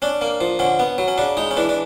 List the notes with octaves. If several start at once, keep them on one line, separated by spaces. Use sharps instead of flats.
C#4 D4
A#3
F3
D3 C#4
B3
F#3
C#4
C#3 D4
G#3 D#4
C#4
E3 D4
D4